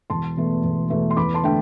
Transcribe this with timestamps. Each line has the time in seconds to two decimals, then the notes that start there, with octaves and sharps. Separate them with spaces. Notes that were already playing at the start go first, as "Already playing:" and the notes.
0.10 E1 A5 C6
0.37 E2 B2 A3
0.64 E1
0.90 E2 B2 A3
1.10 C6
1.17 E2 B5 D6
1.34 A5 C6
1.43 D3 A3 D4 G5